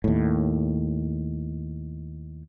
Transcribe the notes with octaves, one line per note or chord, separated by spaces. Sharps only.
D#2 A2